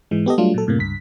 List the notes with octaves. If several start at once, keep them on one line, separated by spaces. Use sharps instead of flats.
G#2 E3 G#3
B3 G4 A4 D#5
F#3 G3 A3 D4 F4
A#2 F#3 A4
F#2 A2 C3 A#3
C#2 G2 B6